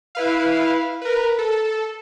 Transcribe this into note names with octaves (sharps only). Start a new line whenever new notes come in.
E4 B4 F5
A#4 B4
A4